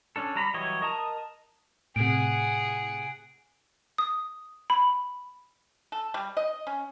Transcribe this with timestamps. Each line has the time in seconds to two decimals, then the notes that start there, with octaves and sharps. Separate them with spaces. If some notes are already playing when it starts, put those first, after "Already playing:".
0.16 C#4 D4 A4
0.35 G3 A#5 B5
0.54 E3 F#3 G3 C#5 D#5
0.82 A#4 D#5 A5 A#5 D#6
1.96 A2 C3 G#4 F#5 D7
3.98 D#6
4.70 B5
5.92 A4
6.14 G3
6.37 D#5
6.67 C#4